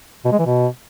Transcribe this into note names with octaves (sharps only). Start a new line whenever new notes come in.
B2
G#3
E3
B2